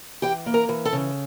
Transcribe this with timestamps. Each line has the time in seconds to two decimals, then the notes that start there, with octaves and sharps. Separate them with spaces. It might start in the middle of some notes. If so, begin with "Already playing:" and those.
0.22 E3 G4 G5
0.46 A#3
0.54 A#4 A#5
0.69 E3
0.85 A4 A5
0.93 C#3